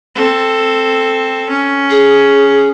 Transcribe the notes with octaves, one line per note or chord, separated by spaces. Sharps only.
C4 A4
C#4
G#4